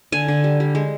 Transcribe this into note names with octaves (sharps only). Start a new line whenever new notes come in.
D3 G#5
D3
G3
G3
G#3